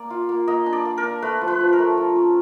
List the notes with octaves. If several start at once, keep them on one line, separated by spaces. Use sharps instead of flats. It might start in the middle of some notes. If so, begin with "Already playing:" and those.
Already playing: A#3 D5
F4
A#3
A#3 D#5
D4
D5
A#3
A#4
D4
A3 B4
F3
B4
F3
A#4
A3
F3
C#4